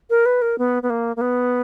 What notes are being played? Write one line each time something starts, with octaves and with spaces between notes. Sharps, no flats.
A#4
B4
A#4
B3
B3
A#3
A#3
B3